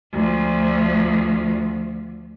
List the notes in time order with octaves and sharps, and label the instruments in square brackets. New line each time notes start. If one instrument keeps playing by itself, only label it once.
[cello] D2 F3